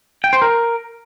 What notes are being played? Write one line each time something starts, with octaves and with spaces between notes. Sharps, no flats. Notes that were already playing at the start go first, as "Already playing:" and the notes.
G5
C5
A#4